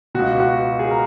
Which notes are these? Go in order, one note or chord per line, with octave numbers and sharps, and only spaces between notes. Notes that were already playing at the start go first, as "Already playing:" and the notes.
C#2 B2 F#4
F#4
G#4
A#4